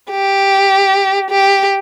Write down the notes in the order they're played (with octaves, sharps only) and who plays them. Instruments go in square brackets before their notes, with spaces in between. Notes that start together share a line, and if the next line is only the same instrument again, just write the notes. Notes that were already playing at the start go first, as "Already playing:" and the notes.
[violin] G4
G4